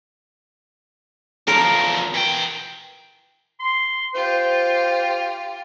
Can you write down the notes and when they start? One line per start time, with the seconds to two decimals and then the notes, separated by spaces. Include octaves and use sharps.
1.48 E2 F3 A#4
2.15 E3 G5
3.60 C6
4.14 F4 G4 C5